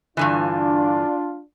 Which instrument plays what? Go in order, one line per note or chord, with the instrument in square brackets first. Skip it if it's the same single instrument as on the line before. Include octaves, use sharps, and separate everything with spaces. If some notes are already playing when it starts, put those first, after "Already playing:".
[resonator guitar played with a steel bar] G2 D3 E3 [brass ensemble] D4 F4